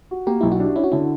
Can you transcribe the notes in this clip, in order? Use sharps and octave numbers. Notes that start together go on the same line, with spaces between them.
F#4
A#3 G4
B1 E4
F#4
D4
C#4 E4
F#4
D3 E4